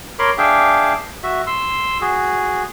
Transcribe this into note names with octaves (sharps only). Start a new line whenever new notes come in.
A#4 C#5 B5 C6 D6
D4 G#4 E5 F5 G5 D6
F#4 E5
C6 E6
F#4 G#4